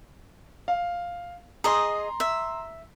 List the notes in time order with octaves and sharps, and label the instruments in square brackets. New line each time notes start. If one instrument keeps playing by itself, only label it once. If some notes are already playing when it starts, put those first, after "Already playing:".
[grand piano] F5
[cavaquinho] G#4 D#5 [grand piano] A#5 C6
[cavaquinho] E5